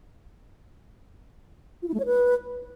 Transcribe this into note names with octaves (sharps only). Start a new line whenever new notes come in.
F4
E4
A3
C#5
B4